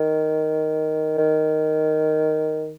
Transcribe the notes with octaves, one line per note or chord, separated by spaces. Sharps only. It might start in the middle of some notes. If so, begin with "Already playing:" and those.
Already playing: D#3
D#3